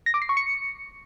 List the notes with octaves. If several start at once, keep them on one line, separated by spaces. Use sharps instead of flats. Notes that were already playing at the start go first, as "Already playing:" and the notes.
A#6
D6
C7
C#6
C#7